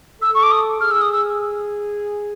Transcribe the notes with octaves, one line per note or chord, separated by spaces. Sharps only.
A4 E6
C#6
D6
D#6
G#4 F6
E6
D#6
E6